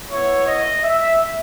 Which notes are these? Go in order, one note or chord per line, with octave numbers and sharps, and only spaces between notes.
B3 E4 C#5
D#5
E5